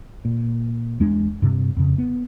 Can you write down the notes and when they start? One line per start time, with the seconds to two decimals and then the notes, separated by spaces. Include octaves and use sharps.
0.25 A#2
1.00 E2 G#3 D4
1.42 G2 C3
1.77 F2 C#3
1.98 B3